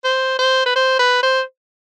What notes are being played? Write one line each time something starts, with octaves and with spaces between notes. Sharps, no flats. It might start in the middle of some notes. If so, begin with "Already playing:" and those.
C5
C5
B4
C5
B4
C5